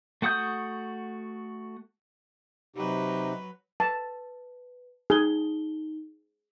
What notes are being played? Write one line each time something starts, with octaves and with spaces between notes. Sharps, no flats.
A3 F#4 F#5 D#6 G6
C3 F#3 D#4 G4 B4
B4 A5
D#4 G#4 G7